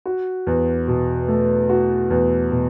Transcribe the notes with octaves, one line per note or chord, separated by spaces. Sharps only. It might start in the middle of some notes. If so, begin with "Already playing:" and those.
F#4
E2
B2
A3
F#4
E2
B2